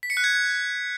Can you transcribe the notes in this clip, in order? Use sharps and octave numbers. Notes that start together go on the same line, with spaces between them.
B6
C#7
F#6
G#6